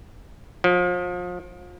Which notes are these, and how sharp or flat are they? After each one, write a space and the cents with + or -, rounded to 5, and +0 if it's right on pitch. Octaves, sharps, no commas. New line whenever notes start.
F3 +35